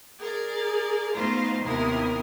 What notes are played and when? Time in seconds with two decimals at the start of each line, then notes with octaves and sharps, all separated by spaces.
0.18 G#4 A#4 D5
1.13 A3 B3 D#4 F4 C5 F5
1.62 D#2 C3 B3 E4 A#4 D#6